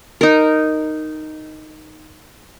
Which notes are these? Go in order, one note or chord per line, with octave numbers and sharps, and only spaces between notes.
D#4 A#4